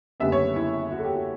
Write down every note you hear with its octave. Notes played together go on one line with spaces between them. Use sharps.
F#1 F#2 D3 G3 B3 E5
C#5
E4
F#4
A4
G4
F#4